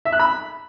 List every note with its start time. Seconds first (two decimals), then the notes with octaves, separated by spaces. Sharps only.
0.05 E5
0.12 F#6
0.20 B5